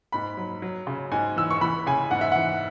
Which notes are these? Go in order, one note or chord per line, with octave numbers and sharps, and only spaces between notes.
G#2 B5
F#3
F#3
C#3
G#2 G#5
E3 E6
C#6
E3 B5
C#3 G#5
G#2 F#5
E5
E3 F#5